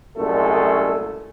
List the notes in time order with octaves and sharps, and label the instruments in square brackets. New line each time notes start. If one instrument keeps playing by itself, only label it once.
[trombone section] C2 F#2 A#2 G#3 A3 A4